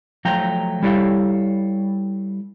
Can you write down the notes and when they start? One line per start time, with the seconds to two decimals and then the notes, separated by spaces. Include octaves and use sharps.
0.25 F3 F#3 A3 G5 A#5
0.83 G3 E4 A4 C#5 D5 F5